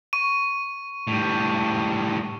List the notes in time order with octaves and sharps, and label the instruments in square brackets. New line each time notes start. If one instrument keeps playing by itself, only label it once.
[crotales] C#6 D#7
[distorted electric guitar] A2 G3